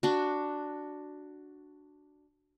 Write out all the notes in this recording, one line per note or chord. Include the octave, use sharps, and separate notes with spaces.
D4 F#4